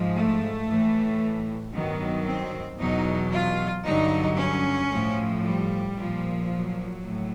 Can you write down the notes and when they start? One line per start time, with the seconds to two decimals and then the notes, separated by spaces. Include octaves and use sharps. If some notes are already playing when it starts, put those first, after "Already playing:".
Already playing: G#2 F3
0.14 A3
0.67 A2 E3
1.73 G2 D#3 F#3 B3
2.27 C4
2.79 E2 B2 F#3 D#4
3.32 F4
3.86 G2 D3 F#3 D#4
4.38 C#4
4.91 A2 F3
5.44 G3
5.97 A#2 F3
6.51 F#3
7.04 A2